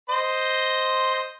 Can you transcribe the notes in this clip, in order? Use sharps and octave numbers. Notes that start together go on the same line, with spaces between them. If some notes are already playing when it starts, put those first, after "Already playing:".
C5 D#5 C6